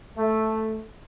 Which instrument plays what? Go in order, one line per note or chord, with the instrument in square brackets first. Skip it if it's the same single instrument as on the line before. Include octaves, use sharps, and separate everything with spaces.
[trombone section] A3